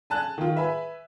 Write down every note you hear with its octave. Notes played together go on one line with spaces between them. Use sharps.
G#5 A5 F#6
D#3 F4
B4 E5 G#5 B5